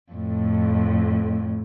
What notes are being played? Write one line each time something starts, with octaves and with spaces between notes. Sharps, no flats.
F2 A2